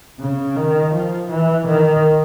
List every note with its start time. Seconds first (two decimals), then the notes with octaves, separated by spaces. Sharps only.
0.20 C#3
0.56 D#3
0.93 F3
1.30 E3
1.67 D#3